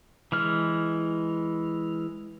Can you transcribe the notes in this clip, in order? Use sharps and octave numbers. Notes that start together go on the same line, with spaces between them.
E3 G#3 F6